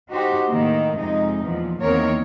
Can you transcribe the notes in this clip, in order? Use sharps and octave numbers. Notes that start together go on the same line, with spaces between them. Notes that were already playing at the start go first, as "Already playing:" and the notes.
D#4 F#4 G4 C5
A2 D#3 A#3 D#4
F2 C3 G#3 D#4
E2 A#2 F3
E2 D#3 A#3 C4 A#4 C#5